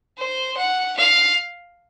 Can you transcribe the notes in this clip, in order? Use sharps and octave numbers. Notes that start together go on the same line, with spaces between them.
C5
F#5
F5